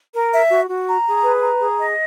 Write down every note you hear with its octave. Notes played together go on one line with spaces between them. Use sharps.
A#4
E5
F#4
F#4
A#5
G#4
B4
A#5
G#4
D#5